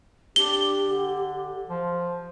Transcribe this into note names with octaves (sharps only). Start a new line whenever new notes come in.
D4 G4 G7
D3
F3